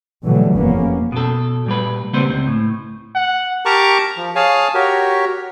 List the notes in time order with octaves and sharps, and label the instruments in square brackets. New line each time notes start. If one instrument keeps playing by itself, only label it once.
[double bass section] B2 D3 E3 F#3 G3 A3
F1 F2 E3 A#3 B3 C#4
[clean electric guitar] B2 A4
A#2 G3 B4
C#3 G3 A#3 C4 B4 C5
C#2 C4
A2
[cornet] F#5
[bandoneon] G4 A#4 A5 A#5 C#6 D6
F3
G#4 C#5 F5 G#5 A5
F#4 G4 A#4 C#5